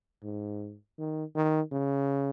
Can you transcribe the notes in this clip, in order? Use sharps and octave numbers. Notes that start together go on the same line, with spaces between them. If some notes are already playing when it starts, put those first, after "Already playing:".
G#2
D#3
D#3
C#3